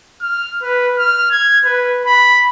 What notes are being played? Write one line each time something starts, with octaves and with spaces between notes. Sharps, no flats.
F6
B4
F6
G#6
B4
B5